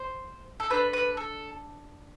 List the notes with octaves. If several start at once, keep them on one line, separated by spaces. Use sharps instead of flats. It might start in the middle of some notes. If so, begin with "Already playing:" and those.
Already playing: C5
A4
D4 A4 B4
B4
A4